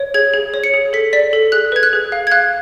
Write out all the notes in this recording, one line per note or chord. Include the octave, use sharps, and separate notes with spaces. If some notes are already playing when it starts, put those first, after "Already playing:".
Already playing: C#5
G#4 G#6
G#4
C#5
C#7
G#4
A4 B6
D5 B6
A4
G#4 F#6
B4 G#6
F#6
G#4
F5
G#6
F5 F#6